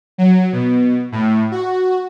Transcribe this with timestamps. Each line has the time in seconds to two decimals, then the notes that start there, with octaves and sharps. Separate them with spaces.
0.18 F#3
0.53 B2
1.12 A2
1.52 F#4